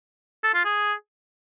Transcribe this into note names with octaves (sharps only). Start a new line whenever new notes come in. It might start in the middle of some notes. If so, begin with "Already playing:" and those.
A4
F4
G#4